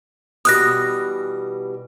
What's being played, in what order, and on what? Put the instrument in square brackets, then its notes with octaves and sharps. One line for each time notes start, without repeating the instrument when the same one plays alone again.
[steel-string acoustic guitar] B2 E3 G3 [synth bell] D#6 F#6 A#6